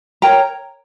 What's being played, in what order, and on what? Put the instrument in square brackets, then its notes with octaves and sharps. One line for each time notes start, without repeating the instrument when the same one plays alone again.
[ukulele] A#4 C#5 G5 A#5